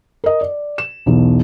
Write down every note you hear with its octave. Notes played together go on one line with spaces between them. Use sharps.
A#4 D#5
D5
E7
B1 E2 B2